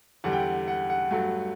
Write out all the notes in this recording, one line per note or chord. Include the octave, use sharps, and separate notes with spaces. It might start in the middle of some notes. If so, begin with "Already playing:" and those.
E2 D3 G3 F#5
G5
F#5
F#5
F#5
G2 F#3 A3